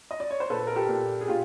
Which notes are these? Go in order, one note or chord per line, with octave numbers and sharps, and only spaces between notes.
D#5
D5
C#5
C5
A#2 A4 B4
A#4
G4 A4
A#2
G#4
A#2 F4 G4